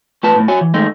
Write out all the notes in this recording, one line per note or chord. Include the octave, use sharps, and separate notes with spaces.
A3 F4 B4 A5
A2 A3
F#4 C#5 G#5
E3
D#3 G#3 A3 D#4